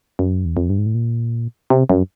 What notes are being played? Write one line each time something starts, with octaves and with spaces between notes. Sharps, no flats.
F#2
E2
F2
G2
G#2
A2
A#2
C3
F#2